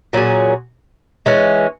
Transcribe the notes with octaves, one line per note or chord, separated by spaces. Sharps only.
A#2 F#3 C#4 G#4
E3 G#3 C#4